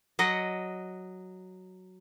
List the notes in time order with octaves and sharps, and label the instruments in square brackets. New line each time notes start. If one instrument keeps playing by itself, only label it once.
[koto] F#3 D#5 F#5